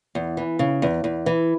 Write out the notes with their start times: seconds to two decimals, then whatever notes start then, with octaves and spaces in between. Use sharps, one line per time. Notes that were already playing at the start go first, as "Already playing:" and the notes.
0.15 E2
0.37 E3
0.59 C#3
0.82 E2
1.04 E2
1.26 E3